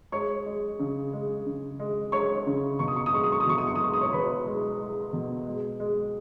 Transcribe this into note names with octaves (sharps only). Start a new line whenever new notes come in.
G#3 C#5 C#6
G#3
C#3
G#3
C#3
G#3
G#3 C#5 C#6
C#3
B2 C#6
D#6
C#6
D#6
G#3 C#6
D#6
C#6
D#6
B2 C#6
D#6
C#6
D#6
G#3 C#6
D#6
C#5 C#6
B2 B4 B5
G#3
G#3
B2
G#3
G#3